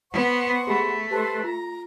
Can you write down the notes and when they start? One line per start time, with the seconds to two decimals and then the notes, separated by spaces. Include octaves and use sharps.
0.13 B3 C5 F#5 C#6
0.67 A3 G4 G#4 B5
1.11 G4 A4 B4 C5 A5
1.44 F4 A#5